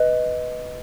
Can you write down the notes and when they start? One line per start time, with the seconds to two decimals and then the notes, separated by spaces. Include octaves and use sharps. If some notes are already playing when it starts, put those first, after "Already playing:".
Already playing: B4 D#5